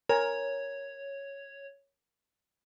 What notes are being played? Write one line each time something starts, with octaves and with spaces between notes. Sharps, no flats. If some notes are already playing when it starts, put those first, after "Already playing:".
A#4 C#5 G#5